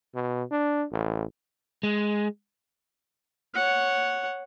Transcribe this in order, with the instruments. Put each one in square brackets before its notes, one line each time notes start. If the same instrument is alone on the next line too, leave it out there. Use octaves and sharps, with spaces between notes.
[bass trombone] B2
D4
A1
[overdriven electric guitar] G#3
[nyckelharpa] C#5 F#5